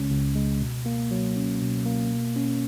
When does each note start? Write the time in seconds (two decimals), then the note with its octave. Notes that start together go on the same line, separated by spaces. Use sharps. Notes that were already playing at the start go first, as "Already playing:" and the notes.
Already playing: C#2 C#3 G#3 C#4
0.11 C#2
0.35 G#3
0.61 B2
0.86 A#3
1.11 F#3
1.36 C#4
1.61 B2
1.86 A#3
2.11 B2
2.36 C#4